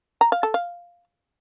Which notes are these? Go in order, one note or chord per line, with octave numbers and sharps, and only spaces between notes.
A#5
F5
A4
F5